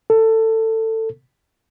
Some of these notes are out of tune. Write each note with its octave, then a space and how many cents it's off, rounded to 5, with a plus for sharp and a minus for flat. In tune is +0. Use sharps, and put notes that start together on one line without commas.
A4 +20